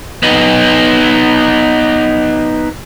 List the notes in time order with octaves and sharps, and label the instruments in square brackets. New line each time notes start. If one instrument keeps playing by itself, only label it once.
[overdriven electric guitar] B3 D#4